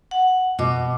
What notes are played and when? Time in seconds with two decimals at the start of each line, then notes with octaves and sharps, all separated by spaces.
0.11 F#5
0.59 B2 D#5 D6